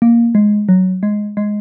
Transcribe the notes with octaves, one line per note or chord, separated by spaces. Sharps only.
A#3
G#3
F#3
G#3
G#3